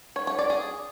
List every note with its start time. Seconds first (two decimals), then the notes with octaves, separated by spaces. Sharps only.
0.16 C#5
0.27 C#5
0.39 D5
0.50 G#4